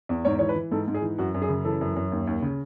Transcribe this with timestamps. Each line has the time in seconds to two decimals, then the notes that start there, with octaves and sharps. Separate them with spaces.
0.09 E2
0.25 G#2 C#5
0.39 E3 C#5
0.49 B4
0.56 E3
0.71 G#2 A4
0.88 G#2
0.94 G#4
1.02 E3
1.18 F#2 F#4
1.34 F#2
1.42 G#4
1.49 C#3
1.65 E3 A4
1.81 F#2
1.96 F#2
2.12 D#2
2.27 D#2
2.42 C#3